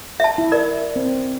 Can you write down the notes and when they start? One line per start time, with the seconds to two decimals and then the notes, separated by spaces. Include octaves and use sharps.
0.20 E5 A5
0.38 E4
0.52 A#4 D5
0.96 C4